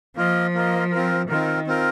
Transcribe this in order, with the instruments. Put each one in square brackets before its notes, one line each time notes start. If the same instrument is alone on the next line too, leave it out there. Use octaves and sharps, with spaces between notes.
[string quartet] F3 [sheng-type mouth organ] A#3 F4 A#4 D#5
[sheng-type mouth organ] A#3 F4 A#4 D#5
C4 F4 A#4
[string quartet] D#3 [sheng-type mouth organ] C4 F4 A#4
[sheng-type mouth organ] C4 F4 A#4